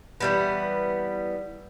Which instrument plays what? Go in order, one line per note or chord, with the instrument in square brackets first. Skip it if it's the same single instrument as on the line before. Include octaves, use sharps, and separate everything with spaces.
[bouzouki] E3 G3 B3